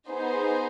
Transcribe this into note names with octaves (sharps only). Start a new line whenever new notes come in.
B3 D#4 G#4 C5